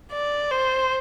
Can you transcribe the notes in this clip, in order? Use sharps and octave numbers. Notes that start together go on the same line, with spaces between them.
D5
C5